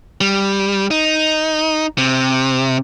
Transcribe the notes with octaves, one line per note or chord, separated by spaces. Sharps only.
G3
D#4
C3